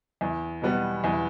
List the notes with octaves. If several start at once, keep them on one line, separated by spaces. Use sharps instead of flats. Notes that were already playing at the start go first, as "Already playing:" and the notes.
E2
B2 G3 B3
E2